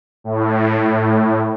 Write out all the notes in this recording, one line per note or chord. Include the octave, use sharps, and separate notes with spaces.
A2